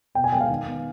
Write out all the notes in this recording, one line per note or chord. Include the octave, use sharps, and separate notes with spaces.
B2 G5
G#5
G#3 B3 G5
F5
D#3
B3